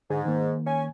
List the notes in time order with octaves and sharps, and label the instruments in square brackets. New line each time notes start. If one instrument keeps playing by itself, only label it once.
[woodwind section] G#2 [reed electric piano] D3 G#4
[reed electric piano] D#3 A#3
[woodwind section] C#4 G#5